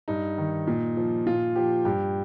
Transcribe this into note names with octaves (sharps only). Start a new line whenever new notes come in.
G2 D#4
D#3
A#2
F3
A#2 F4
F3 G4
G2 G4